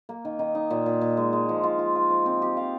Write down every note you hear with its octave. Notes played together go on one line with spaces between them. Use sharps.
A#3
D#3
D#3
D#4
A#2
A#2
A#2
G#3
G#3
F3
F4
F4
F4
F3
C4
G4
F5